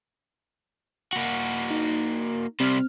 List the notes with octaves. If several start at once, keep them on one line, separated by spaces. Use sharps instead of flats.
A#3 F#4
D#4
C3 G3 C4 F6